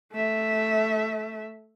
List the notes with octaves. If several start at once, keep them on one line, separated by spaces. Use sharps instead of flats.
A3 E5